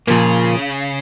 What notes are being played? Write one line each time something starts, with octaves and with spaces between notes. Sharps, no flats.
A#2 C#3 F3 A#3